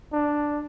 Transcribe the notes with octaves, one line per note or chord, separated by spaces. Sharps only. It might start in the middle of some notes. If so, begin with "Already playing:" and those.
D4